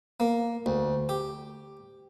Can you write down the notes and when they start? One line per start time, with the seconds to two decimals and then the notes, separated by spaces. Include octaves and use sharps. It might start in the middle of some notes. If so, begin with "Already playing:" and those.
0.20 A#3
0.66 D2
1.09 G4